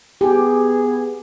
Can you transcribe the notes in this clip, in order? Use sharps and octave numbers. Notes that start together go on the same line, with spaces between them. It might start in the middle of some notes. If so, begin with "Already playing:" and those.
B3 G4 G#4